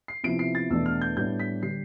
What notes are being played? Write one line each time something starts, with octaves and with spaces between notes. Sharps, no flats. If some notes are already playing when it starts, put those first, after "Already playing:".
C7
C3 F3 B3 E4 D7
C7
A6
E2 B2 A3 D4 E6
F6
G6
A2 G3 B3 D4 G6
B6
D3 G3 C7